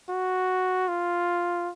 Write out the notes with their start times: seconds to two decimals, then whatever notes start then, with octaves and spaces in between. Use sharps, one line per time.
0.10 F#4
0.88 F4